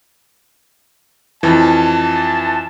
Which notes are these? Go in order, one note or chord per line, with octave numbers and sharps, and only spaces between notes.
F2 E3 A5